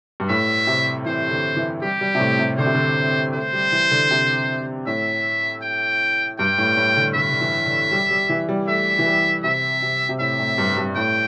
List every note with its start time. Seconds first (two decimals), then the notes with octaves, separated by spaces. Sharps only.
0.20 G2
0.29 A2 E5
0.67 C3
1.06 E3 C5
1.31 D3
1.57 E3
1.82 G3 G4
2.01 G3
2.15 C3
2.20 A2
2.39 C3
2.58 D3 C5
2.66 C3
2.75 D3
3.34 A3 C5
3.53 G3
3.72 E3
3.91 D3
4.11 C3
4.87 A2 E5
5.62 G5
6.39 G2 G5
6.58 A2
6.77 A2
6.97 D3
7.15 D3 E5
7.31 D3
7.41 E3
7.66 D3
7.92 G3
8.10 G3
8.29 E3
8.49 G3
8.68 A3 E5
8.99 E3
9.06 G3
9.44 C3 E5
9.82 C3
10.09 C3
10.20 A2 E5
10.39 A2
10.58 G2
10.77 G2
10.96 A2 G5